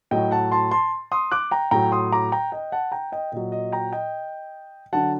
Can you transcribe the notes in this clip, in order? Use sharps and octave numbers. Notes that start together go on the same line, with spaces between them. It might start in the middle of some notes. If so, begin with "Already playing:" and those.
A2 F#3 D#5 G5
F#5 A5
A5 C6
A5 C6
C6 D#6
D6 F#6
G5 A#5
A2 F#3 G5 A#5
C6 D#6
A#5 D6
G5 A#5
D#5 G5
F#5 A5
G5 A#5
D#5 G5
A#2 F#3 D#5
D#5
G5 A#5
D#5 G5
D3 F#3 F#5 A5